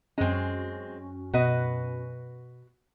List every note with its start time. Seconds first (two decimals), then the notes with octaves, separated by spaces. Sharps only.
0.18 F#2 G#3 C4 C#4
1.34 B2 F#4 B4 D#5